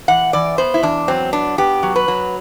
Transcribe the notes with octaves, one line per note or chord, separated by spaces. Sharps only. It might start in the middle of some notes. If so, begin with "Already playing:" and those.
E3 F#5
E3 D5
B3 C5
E4
E2 D4
F#3 C4
B3 D4
B3 G4
F#3
B4
F#3